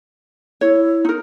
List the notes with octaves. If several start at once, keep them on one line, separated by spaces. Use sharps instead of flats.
E4 C#5
D#4 A#4